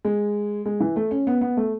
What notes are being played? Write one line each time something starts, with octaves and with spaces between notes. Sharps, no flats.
G#3
G#3
E3
A3
C#4
B3
B3
A3